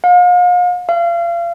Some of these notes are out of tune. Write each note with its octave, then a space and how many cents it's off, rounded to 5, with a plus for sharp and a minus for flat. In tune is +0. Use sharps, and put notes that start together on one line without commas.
F5 +40
F5 -35